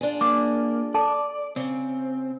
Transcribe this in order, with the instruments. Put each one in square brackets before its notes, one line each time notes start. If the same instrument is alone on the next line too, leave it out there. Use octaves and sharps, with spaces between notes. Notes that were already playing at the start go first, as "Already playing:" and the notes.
[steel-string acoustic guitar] D4 F4 G#4
[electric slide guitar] A#3 [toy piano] D6
[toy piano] A4 A5 [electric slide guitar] D5
[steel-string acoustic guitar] C#3 [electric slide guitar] C4